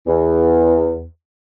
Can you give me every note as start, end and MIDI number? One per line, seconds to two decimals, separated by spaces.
0.07 1.04 40